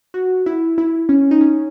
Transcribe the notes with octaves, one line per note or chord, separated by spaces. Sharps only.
F#4
E4
E4
C#4
D#4
C#4